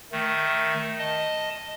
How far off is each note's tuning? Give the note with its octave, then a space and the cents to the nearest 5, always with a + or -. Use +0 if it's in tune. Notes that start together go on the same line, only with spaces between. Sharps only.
D#3 +0 A3 +0
D#5 +0 A5 +5